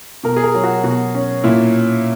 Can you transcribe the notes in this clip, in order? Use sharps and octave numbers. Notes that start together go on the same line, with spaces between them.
B2 A#4
G#4
A#4
F#3
F#4
B2 F#4
C#4
A#2 E4